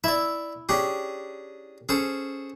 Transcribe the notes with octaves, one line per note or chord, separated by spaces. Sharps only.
E4 D5 E5
C#4 D4 G4 G#4
C#4 G#4 A4 C5